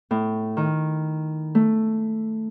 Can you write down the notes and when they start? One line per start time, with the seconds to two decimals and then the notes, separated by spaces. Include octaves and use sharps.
0.11 A2
0.57 D#3
1.55 A3